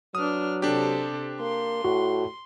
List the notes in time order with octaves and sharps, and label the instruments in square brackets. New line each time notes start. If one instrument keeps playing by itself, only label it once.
[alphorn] F#3 [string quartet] D4 B4 F6 [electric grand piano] D#6
[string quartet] C3 A4 C5 [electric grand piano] D4 G4
[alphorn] A#3 [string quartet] C6
[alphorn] A2 [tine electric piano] F#4